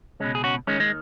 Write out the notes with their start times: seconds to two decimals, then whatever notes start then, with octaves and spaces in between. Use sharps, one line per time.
0.20 C#2 B2 G#3 C#4
0.35 G#4
0.44 C#4 F#4
0.67 D#2 D#3 G#3 C#4
0.80 G#3